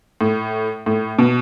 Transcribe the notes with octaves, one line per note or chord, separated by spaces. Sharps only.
A2
A2
B2